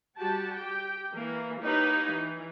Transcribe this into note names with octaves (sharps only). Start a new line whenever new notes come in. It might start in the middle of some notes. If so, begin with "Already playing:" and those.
G3 F#4 G4 A5
G4 G5
E3 A#3
A#3 D#4 E4 G4 B4 C#5
E3